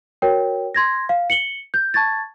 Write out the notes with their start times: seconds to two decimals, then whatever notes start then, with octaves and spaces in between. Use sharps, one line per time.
0.22 F#4 A#4 C#5 G5
0.75 C6 G#6 A#6
1.09 F5
1.30 C#7 F#7 G7
1.74 G6
1.94 A5 C#6 G#6 A6